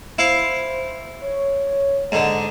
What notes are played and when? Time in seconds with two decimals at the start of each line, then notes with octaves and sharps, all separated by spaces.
0.19 E4 C5 F5
1.21 C#5
2.12 G#2 D3 D#5